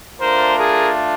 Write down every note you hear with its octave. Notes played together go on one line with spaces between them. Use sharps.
A3 D4 F4 A#4 C5
G#4 A#4